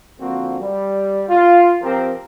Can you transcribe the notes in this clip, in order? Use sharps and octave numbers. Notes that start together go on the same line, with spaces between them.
D3 F3 A#3 C4 F#4
G3
F4
F3 C4 G4 A#4